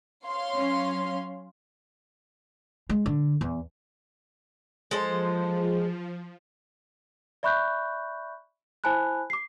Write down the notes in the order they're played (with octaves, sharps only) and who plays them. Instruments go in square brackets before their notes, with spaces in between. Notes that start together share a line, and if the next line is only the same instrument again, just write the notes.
[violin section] C#5 F5 C6
[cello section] F#3 C#4
[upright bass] G#3
D3
E2
[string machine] F3 [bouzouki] G#3 A4 C5
[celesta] D5 E5 B5 C#6 F#6 G6
E4 C5 G#5 A5 B5 F#6
D6 C7